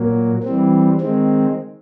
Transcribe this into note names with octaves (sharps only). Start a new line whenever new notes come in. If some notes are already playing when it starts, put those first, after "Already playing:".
Already playing: A#2 F#3 A#3
E3 G3 C4
D#3 G#3 C4